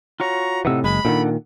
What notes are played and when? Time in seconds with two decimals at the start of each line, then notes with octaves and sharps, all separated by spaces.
0.20 F4 F#4 C#5 A#5
0.65 A2 C3 E3 D#4 F#5 E6
0.84 F#1 G#3 B5
1.05 A#2 D3 D#3 D4 A4 F#5